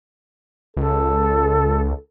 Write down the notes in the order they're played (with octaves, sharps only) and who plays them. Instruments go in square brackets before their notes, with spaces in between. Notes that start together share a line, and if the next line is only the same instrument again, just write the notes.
[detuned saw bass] C#2 [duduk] A4